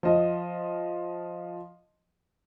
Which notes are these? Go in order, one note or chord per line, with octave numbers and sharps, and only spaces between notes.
F3 D#5